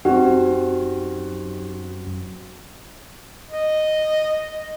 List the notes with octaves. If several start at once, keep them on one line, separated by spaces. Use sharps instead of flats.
F#2 C4 D#4 F#4 G4
D#5